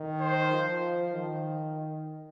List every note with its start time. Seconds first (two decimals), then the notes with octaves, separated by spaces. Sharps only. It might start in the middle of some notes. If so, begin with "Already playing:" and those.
Already playing: D#3
0.21 C5
0.52 F3
1.14 D#3